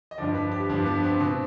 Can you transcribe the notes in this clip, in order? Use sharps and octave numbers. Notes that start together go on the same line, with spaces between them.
D#5
G2 D3 F3 D5
B4
G4
G2 D3 F3 D4
B3
C4
B2 C4